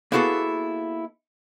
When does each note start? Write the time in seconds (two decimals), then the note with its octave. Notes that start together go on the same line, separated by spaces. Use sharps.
0.12 A#3 B3 E4 F#4 G#4 A4